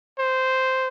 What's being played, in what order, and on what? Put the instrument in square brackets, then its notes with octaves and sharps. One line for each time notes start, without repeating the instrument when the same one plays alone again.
[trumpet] C5